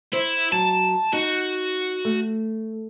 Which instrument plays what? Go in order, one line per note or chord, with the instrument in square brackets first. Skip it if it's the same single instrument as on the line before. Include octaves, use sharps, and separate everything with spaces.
[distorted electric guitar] E4 [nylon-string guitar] C5
[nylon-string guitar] F#3 [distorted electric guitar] A5
[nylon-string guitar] D#4 [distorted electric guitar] F#4
[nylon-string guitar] A3